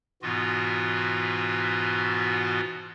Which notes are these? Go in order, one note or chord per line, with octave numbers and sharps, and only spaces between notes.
G#2 B2 E3 B3 F4 F#4